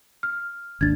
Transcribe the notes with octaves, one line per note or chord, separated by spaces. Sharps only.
F6
G#1 D#2 D4 G#6 A6